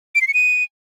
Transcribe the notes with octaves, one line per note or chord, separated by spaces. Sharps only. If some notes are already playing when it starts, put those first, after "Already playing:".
D7
C7
C#7
D#7